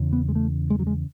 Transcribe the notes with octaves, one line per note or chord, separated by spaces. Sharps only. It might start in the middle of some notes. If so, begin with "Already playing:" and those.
Already playing: E2 C#3
B3
G#3
A3
G#3
F#3
G#3